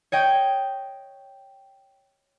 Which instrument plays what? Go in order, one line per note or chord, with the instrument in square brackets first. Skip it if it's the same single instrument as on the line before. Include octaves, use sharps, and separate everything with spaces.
[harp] C#5 D#5 G5